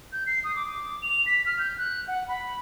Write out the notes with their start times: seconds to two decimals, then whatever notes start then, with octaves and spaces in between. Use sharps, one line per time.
0.13 G6
0.27 C7
0.44 D#6
0.56 D6
1.02 F7
1.26 B6
1.46 F6
1.59 G6
1.78 F#6
2.08 F#5
2.28 B5